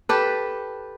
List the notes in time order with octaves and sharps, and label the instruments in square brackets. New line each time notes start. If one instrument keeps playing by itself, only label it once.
[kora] G4 A4 B4